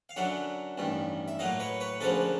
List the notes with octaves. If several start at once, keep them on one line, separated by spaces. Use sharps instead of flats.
F5
F#2 D3 F#3 E5 F#5
A1 G2 D#3
E5
A2 F#3 A#3 D#5 F5
B4 C#5
B4 C#5
D2 C#3 F3 A#3 A4 B4